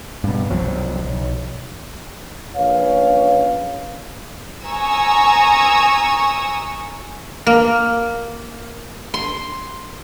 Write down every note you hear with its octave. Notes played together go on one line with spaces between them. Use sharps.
G2 B2
C2 F3 F#3
B1
A#1 C#4 B4 C#5 F5
G#5 A#5 C#6 D#6 E6
A#3
C6